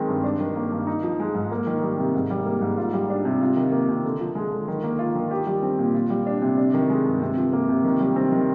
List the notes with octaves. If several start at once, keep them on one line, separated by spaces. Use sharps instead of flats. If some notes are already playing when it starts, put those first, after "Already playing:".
Already playing: D#3 G#3 C4
G2
D4
D#3
A#3
G2
D#4
F3
G#3
G#2
A#3
D#3
G3
C3
G#2
G3
A#3
G#2
F4
G3
D4
C3
F4
D#3
A#3
C3
D3
F3
G#3
D3
D#3
A#3
F4
D#3
G4
G3
C4
A#2
F4
G3
D4
C3
D4
D#3
G#3
G2
C3
F3
A#3
C3
D#3
G3
C4
D#3